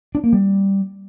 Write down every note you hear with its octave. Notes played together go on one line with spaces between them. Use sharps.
D4
A#3
G3